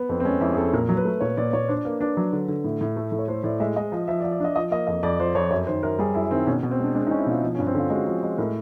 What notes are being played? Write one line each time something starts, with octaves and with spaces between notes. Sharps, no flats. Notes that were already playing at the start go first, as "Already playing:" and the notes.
Already playing: B3
F2 C4
C4
G#3 C#4
F2 E4
G#4
F2 A4
A#2 A#4
F#3
B4
A3
A#2 C#5
A#2 D5
A#2 C#5
D4 C5
A#3 B4
D4 B4
F#3
D3
D3
A2
A2
A3
A2
C#5
A3 C5
A2 D5
G#3 E5
G#3 D#5
F3
F3 E5
D5
F3
D5
D4 D#5
F3 D#5
A#3 D#5
F2 D#5
F2 D5
F3 C5
F2 C#5
F#2 C#5
D#3 C5
F#2 A#4
G3 G#4
F#2 E4
D#3 C4
B2 C#4
B2
C4
G#3 D4
G#3 D4
D#4
C#4
E4
B2 F4
F3
C#4
G2
C4
D3 F4
G#3 F#4
F3
G#3
A2 A#4